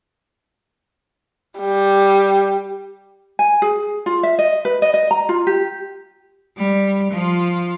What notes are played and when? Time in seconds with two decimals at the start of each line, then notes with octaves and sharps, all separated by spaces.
1.59 G3
3.39 G#5
3.62 G#4
4.06 F4
4.23 E5
4.39 D#5
4.65 B4
4.82 D#5
4.94 D#5
5.11 A#5
5.29 F4
5.47 G4
6.58 G3
7.11 F3 F4